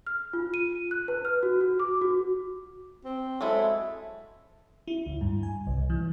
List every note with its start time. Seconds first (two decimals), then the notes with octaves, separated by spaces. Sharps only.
0.06 F6
0.33 F4
0.54 D#7
0.91 F#6
1.08 B4
1.25 F6
1.43 F#4
1.61 F#4
1.80 D6
2.02 F#4
3.05 C4
3.41 F#3 G#3 E4 A4 E5
4.88 E4
5.06 D2
5.21 G2
5.43 G#5
5.67 C2
5.90 E3